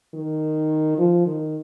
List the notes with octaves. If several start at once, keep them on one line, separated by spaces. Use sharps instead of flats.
D#3
F3
D#3